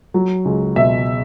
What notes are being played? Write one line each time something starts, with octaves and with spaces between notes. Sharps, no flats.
F#3
C#2
B2 E5